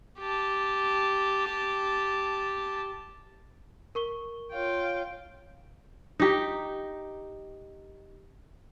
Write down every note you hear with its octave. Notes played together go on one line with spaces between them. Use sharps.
G4 A5
A#4 C#6 G7
F4 C#5 F5 G5
D#4 G4